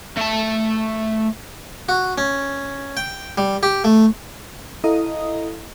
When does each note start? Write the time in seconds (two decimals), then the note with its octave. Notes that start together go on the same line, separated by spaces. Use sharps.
0.17 A3 A5
1.89 F#4
2.18 C#4
2.97 G5
3.38 G3
3.63 G4
3.84 A3
4.84 E4 A4 D#5 F5 A#5 D#6